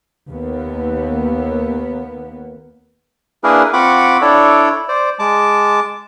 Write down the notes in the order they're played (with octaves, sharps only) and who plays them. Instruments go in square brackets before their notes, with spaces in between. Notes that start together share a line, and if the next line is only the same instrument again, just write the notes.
[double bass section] D#2 A#3 B3
[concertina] A#3 D4 E4 G#4 A#4 B4
C4 F4 F#5 B5 C#6 D6
D4 E4 A4 C#5 D5
C5 D5
G#3 A5 D6